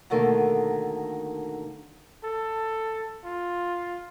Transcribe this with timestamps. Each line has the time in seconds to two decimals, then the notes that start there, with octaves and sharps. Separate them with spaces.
0.10 B2 D3 D#3 A3 A#3
2.24 A4
3.24 F4